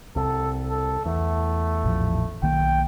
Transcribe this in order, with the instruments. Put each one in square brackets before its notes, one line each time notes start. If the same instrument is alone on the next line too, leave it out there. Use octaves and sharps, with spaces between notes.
[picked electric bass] C2 [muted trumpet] A4
[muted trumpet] A4
[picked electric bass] E2 [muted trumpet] A3
[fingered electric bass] A1 A#2 F3
[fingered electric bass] B1 D#3 A#3 [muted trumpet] G5